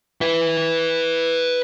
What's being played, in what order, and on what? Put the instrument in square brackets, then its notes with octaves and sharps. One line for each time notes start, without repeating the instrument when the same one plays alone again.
[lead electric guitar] B4 E5